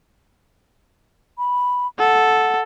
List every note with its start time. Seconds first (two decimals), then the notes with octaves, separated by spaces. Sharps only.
1.38 B5
1.99 A4 F#5